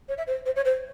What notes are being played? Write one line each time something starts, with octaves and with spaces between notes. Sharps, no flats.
C#5
E5
C5
C5
C#5
C5